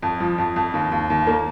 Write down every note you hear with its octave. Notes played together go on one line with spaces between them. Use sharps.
F2
F3
F2
F2
D#2
D#2
D#2
A#3